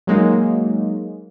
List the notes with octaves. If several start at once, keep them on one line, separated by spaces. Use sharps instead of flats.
F#3 G#3 A#3 D#4